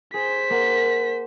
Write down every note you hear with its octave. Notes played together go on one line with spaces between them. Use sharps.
G#4 C5 B6
A#3 F#5